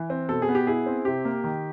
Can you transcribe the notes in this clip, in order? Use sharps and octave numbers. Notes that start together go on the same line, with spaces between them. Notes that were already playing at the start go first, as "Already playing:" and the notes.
Already playing: E3
C4
B2 A4
G#4
B3
G4
E4 G#4
C4
C3 G4
A#3
D#3